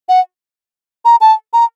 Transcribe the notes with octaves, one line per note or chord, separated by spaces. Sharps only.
F#5
A#5
A5
A#5